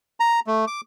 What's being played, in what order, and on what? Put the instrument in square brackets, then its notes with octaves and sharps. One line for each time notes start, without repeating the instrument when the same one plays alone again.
[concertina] A#5
A3
D6